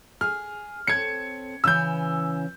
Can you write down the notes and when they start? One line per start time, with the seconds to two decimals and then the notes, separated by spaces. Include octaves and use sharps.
0.21 G#4 F6
0.87 C4 A4 C#5 G#6 C#7
1.64 C#3 E3 C#4 E6 G6